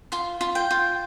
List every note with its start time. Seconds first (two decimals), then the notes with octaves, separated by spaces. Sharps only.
0.12 F4 C6
0.41 F4
0.55 G5
0.71 F4